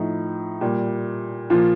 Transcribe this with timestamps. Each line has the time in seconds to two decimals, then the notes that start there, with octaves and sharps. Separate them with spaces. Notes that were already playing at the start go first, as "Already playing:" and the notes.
Already playing: A2 F3 D#4
0.61 A#2 G3
1.50 A#2 F3 F4